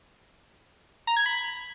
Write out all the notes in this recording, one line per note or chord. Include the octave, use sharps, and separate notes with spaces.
A#5
G#6
B5